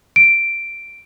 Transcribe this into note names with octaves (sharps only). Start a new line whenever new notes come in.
D7